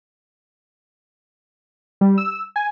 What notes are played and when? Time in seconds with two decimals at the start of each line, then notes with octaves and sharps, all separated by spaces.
2.01 G3
2.18 E6
2.56 G#5